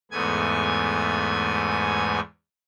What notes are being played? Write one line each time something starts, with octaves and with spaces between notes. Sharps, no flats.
E2 G#2 A3 B3 G#5 G#6